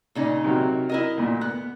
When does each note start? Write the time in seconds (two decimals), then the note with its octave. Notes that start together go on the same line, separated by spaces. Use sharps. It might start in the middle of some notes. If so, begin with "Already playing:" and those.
0.15 A#2 C#3 D#4
0.44 C3 D#3 F#3
0.89 E4 A#4 D#5
1.17 D2 A#2
1.41 B3 F#6